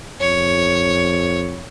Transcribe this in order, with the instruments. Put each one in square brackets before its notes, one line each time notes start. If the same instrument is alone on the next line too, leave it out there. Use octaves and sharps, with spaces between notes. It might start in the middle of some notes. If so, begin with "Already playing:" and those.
[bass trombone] F2 [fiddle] C#5